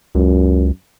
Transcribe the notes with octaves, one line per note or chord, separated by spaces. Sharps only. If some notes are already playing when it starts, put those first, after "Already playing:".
C#2 F#2